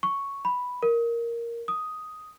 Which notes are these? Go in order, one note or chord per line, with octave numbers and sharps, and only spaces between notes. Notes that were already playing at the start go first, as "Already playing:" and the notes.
C#6
B5
A#4
D#6